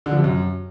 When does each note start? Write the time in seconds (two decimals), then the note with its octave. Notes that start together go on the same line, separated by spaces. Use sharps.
0.06 D3
0.12 F3
0.18 C3
0.24 F#2